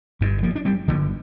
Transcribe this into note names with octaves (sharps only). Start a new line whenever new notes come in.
G1 G2 D3
F3 A#3
D4
G3 C4
G1 G2 D3 F3 A#3